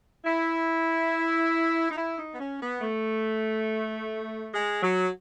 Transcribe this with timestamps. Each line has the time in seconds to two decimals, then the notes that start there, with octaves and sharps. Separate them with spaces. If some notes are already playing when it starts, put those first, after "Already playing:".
0.25 E4
1.89 D#4
1.96 E4
2.17 D#4
2.33 B3
2.39 C#4
2.61 B3
2.81 A3
4.53 G#3
4.81 F#3